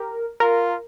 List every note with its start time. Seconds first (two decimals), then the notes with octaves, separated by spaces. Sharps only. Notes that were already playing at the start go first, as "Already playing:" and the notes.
Already playing: G4 A#4
0.40 F4 A#4